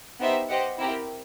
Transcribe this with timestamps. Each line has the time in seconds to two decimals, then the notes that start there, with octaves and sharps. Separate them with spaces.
0.20 B3 D#4 G4 C5 E5
0.49 G4 C5 D#5 F#5
0.79 C4 E4 G4 A#4